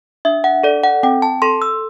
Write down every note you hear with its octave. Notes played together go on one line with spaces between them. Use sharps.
D4 E5
F#5
A4 D5
F#5
C4 G5
A5
A4 C6
E6